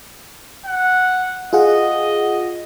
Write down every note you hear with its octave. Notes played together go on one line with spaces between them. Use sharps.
F#5
F4 G#4 D#5 F#5